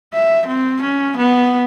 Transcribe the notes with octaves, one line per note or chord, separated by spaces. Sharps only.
E5
C4
C#4
B3